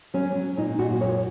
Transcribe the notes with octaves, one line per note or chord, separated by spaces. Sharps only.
F#3 C#4
F#3
A#2 D#4
A#2 F#4
F#2 C#5